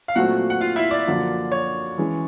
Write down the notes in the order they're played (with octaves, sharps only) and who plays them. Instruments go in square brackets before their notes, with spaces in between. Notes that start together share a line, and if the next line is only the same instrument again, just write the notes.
[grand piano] F5
[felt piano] A#2 F#3 A3 C4 [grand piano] F#4 F#5
[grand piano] F#5
F4 F5
E4 E5
D5
[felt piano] F#2 D3 F3 A#3 D4
[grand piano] C#5
[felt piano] E3 G#3 C#4